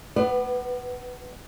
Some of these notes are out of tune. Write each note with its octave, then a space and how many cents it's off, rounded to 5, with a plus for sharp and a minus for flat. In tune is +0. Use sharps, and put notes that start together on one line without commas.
B3 +20 B4 +0 D5 +40